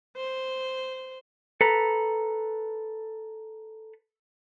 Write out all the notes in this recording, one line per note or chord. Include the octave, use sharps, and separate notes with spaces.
C5
A4 B4 A#5